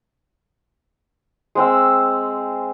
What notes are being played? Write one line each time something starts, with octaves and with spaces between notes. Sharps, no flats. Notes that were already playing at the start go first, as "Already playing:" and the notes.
G#3 C4 E6